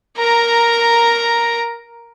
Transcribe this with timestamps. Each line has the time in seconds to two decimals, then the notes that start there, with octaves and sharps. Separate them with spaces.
0.18 A#4 A#5